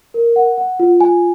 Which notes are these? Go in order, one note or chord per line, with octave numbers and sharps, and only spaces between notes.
A#4
F#5
F#5
F4
G#5